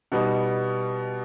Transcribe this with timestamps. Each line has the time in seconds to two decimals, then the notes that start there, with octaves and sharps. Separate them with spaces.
0.12 B2 G3 B3 D#4